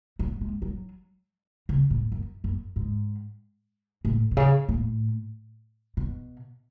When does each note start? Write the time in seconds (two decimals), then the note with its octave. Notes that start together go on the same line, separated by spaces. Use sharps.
0.19 F#3
0.41 G#3
0.62 F#3
1.69 C#3
1.90 A2
2.12 F#2
2.44 F#2
2.76 G#2
4.05 A2
4.31 B2
4.37 C#3
4.69 A2
5.97 B2